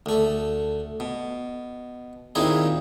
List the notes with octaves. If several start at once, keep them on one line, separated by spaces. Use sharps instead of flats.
D2 A3
B2
D#2 A#2 C4 D#4 E4 G#4